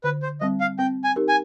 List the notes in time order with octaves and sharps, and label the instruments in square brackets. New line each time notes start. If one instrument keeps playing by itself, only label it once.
[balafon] D3 [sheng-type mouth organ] B4
[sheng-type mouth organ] C5
[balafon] G3 C4 [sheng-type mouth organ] D#5
[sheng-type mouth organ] F5
[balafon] C4 [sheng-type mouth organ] G5
[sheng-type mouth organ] G#5
[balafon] D#4 G4 A#4
[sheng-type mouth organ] G#5